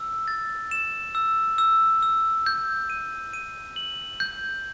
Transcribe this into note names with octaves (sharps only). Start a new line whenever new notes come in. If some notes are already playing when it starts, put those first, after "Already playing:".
Already playing: E6
A6
E7
E6
E6
E6
G6
D#7
D#7
F#7
G6